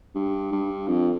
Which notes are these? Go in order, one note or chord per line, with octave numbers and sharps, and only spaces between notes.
G2
G2
F2